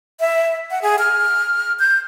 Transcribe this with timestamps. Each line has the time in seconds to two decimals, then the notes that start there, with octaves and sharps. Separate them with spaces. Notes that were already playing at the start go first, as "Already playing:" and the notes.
0.20 E5
0.71 F#5
0.82 G#4
0.99 F6
1.79 G6